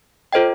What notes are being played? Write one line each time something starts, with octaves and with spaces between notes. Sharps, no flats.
F4 A4 C5 D#5 G5